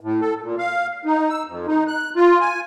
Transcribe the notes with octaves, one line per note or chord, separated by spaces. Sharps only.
A2
A4
A#2
F5
D#4
E6
F2
D#4
F#6
F4
G#5